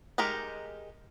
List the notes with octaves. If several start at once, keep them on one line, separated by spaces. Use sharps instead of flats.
G#3 D#4 G4 A#4